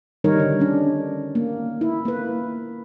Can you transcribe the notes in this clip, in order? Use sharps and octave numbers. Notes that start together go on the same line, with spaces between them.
D#3 G3 D#4 A#4 C#5
D3
C#4 D4
A#3
E4
A#3 B4